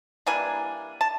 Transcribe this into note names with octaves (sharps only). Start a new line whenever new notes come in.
E3 G3 A#3 D4 G#5
A5